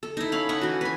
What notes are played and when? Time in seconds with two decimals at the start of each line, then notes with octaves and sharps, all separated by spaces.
0.03 A4
0.17 D#4 E4
0.32 C#4 F5 B5
0.49 C#4 D#4 F#5 C#6
0.61 E3 F#4
0.81 B4 G#5